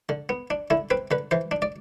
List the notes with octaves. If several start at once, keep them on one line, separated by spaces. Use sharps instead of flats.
D3
B3
D4
D3 E4
C4 B4
D3 B4
E3 C5
D4
D5